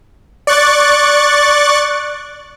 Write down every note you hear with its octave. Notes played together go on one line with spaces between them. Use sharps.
D5 C#6 F#6 A6